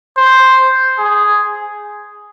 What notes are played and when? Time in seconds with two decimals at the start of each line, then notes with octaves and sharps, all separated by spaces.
0.17 C5
0.99 G#4